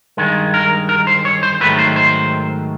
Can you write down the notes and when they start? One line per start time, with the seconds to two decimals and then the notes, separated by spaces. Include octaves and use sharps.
0.17 G2 D#3 G#3
0.54 A#4
0.89 A#4
1.07 C5
1.25 C#5
1.43 C5
1.61 G#2 D#3 F#3 A3 B4
1.78 C5
1.96 C5